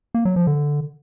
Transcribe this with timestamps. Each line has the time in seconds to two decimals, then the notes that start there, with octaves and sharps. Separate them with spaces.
0.14 A#3
0.25 F#3
0.36 F3
0.47 D3